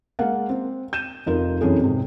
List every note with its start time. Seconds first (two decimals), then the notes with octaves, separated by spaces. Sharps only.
0.19 G#3 A#3 F5 F#5
0.49 C4
0.93 G6 D#7 E7
1.26 F1 D#4 F4 A#4
1.61 C2 F#2 E3 G#4 A4
1.80 F2 G#2 C3